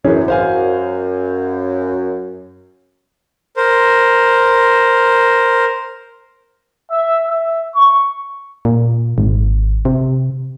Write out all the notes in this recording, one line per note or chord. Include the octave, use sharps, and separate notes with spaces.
F#2 E3 C#4 G#4
C5 F5 G#5
A#4 C5
E5
E5
C#6
A#2
G#1
C3